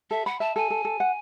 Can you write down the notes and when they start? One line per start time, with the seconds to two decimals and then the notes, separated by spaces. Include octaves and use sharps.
0.10 A4 E5
0.26 F#5 B5
0.40 E5 A5
0.56 A4 G#5
0.70 A4
0.85 A4
1.00 F#5